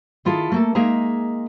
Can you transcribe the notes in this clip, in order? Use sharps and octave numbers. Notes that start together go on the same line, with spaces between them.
D#3 E4 F4 G#4 A4
A3 A#3 A4
G#3 A#3 D#4 G#4 E5 A#5